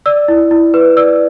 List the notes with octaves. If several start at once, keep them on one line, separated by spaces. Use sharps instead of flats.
D5 E6
E4
E4
B4
D5 E6